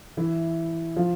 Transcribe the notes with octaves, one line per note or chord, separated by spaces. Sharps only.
E3 E4
F3 F4